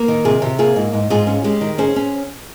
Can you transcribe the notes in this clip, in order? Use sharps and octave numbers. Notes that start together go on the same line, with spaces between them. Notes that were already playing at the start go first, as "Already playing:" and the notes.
Already playing: A#3
D#3
C3 F4 G#4
C3 G4
A#3 F4 G#4
G#2
G#2
G#2 F4 G#4
C#4
G#3 G4
D#3
C#4 G#4 C5
C#4